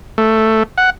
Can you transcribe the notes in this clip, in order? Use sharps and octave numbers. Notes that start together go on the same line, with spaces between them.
A3
F#5